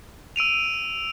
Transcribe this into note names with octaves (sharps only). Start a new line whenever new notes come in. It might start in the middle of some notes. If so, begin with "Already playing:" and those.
E6 D7 D#7 F7